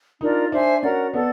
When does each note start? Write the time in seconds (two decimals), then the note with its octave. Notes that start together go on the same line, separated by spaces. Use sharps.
0.21 D4 D#4 F4 A#4 D5
0.52 D4 C5 E5 G#5
0.83 C#4 F#4 A#4 D5 F#5
1.13 B3 A4 D5 F#5